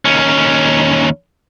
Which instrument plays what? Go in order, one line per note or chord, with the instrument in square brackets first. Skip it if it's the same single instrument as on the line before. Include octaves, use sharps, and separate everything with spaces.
[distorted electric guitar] D#2 C#4